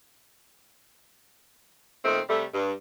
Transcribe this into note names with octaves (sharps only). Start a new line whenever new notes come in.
A#2 D#3 A3 C4
C3 G3 A3
G2